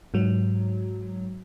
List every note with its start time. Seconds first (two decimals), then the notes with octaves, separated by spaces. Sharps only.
0.14 G#2 F#3